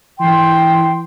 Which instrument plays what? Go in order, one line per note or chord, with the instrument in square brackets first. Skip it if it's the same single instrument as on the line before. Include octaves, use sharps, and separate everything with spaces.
[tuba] E3 [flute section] G5 C6